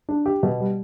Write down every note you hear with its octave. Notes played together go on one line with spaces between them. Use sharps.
D4
G4
B2
G3